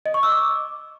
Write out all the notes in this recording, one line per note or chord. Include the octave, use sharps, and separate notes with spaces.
D#5
C#6
E6
D6